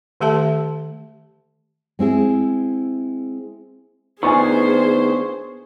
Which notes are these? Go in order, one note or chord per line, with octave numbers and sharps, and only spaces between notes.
D#3 A3 G4 A4 E5 A5
G#3 C4 E4 G#4
D#3 B3 D4 G#4 C5 G#5 C#6